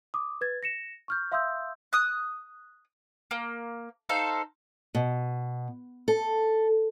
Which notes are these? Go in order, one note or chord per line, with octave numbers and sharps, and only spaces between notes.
D6 D#6
B4 G#6 A6
A#6 C#7 E7
C#6 F6 G6
E5 F5 C6 D#6 E6 G6
D#6 F#6
A#3
D#4 A4 C5 F5
B2
A4